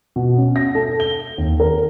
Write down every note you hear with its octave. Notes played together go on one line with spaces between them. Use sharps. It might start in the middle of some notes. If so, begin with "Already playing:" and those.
B2
C#4
A#6
A4
G7
D#2
A#4